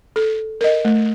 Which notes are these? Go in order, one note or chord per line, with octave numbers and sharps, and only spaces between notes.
A4
A#4 D#5
A3